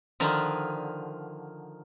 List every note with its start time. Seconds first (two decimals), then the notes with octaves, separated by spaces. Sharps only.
0.20 D3 D#3 F3